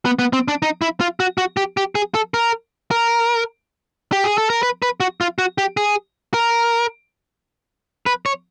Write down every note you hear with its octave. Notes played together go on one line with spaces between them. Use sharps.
B3
B3
C4
D4
D#4
E4
F4
F#4
F#4
G4
G4
G#4
A4
A#4
A#4
G4
G#4
A4
A#4
B4
B4
F#4
F4
F#4
G4
G#4
A#4
B4
C#5